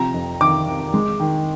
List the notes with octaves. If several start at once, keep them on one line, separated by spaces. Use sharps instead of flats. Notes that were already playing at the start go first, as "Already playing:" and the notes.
Already playing: C3 F3 A#5
F2
D#3 D6
D#3
G#3
D#3